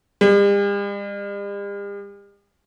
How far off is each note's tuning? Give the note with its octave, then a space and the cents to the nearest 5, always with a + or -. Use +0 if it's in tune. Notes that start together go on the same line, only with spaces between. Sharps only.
G3 +45